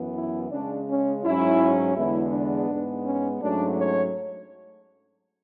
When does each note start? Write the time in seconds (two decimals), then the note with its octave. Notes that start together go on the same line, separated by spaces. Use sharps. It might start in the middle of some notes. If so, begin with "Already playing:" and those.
Already playing: F#2 E3 B3
0.15 E4
0.51 C#3 G#3 C#4 D4
0.88 C#4
1.24 G#2 F#3 C#4 E4
1.96 E2 D3 G#3 B3 E4
2.32 D4
2.69 G#2 G#3 B3
3.05 C#4
3.41 G#2 F#3 A3 C#4 D4
3.78 C#5